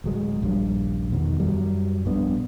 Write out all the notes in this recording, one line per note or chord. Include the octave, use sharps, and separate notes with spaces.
D1 F#3 G#3
D#1 A#1 G2 G3
E2 B2 D3 D#3
F#2 F#3 G3
A#1 G2 B3 D4